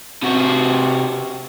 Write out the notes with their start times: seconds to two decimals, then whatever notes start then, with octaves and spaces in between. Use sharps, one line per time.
0.23 C3 F#4